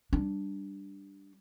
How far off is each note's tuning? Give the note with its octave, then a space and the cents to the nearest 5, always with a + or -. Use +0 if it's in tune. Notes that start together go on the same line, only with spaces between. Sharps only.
G3 +0 D4 +0